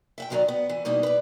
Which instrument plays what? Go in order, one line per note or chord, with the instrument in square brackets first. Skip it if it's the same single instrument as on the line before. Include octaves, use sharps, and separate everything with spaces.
[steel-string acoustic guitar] E5 F#5 G5
F#2 D#3 F#3 G4 D5 A#5
B3
E3
B2 G3 A#3 D#4 E4
B4 D5